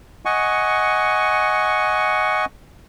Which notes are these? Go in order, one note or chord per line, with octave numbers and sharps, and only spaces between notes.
D#5 F#5 G#5 C#6